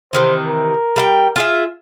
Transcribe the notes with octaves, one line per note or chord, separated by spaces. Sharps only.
C3 D#3 E3 C5
A#4
G3 F5 G5
F4 G#4 E5